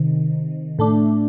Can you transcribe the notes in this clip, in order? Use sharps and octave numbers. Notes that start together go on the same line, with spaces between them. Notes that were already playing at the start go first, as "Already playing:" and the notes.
Already playing: C3 D#3
A2 A3 D4